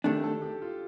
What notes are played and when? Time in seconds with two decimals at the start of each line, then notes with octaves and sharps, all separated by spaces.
0.04 D#3 A3 D4 G4
0.24 A4
0.42 G4
0.62 F4